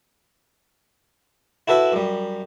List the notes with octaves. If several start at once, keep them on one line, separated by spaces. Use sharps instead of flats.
E4 F#4 A4 B4 E5
F#2 G3